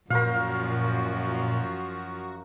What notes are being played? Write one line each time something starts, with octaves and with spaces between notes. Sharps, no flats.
F#2 A#2 F3 F#4 A#4 C5 F5